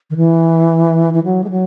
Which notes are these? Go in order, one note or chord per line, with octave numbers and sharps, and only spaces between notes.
D#3
E3
E3
F#3
G#3
F#3